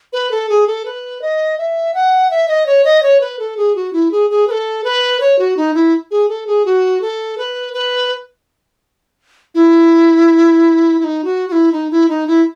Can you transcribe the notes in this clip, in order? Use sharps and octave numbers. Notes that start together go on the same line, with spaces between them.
B4
A4
G#4
A4
B4
D#5
E5
F#5
E5
D#5
C#5
D#5
C#5
B4
A4
G#4
F#4
E4
G#4
G#4
B4
A4
B4
C#5
F#4
D#4
E4
G#4
A4
G#4
F#4
A4
B4
B4
E4
E4
D#4
F#4
F#4
E4
D#4
E4
D#4
E4